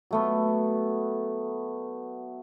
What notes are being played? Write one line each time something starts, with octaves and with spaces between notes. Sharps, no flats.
F#3 A3 B3